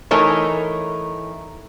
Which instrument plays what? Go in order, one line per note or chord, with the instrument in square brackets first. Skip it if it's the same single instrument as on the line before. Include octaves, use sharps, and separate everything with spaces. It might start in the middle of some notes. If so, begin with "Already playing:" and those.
[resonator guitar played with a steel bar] E3 A3 D#4 A#4 C#5